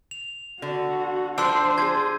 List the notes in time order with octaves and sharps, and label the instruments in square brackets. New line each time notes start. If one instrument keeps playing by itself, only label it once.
[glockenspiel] F7
[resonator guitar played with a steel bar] D3 [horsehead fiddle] F#4
[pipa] D3 G3 D4 [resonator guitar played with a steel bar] F3 [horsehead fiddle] C5 [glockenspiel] C6 E6
[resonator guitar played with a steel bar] F3 G#4 [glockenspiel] G#6